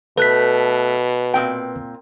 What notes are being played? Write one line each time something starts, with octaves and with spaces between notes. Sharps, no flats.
B2 A3 B4 F#6 B6
A#2 C4 G5